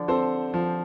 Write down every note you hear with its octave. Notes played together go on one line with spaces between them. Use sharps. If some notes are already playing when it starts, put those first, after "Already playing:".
Already playing: D3 F3
C4 A4 C5
F3